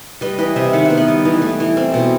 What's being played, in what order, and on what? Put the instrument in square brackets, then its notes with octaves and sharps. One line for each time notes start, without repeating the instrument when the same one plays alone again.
[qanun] G3 B4 D#5
E3 B4 D#5
C3 C5 E5
D#3 F#5
B3 E5
D#5 F#5
G3
E3
A3
E3
C4
B2